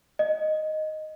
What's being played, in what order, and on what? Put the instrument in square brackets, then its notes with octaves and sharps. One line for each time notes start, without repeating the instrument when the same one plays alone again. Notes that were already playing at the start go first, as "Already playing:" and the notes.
[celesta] D#5